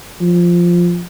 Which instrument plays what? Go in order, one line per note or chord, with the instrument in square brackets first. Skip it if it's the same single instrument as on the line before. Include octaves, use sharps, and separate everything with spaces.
[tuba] F3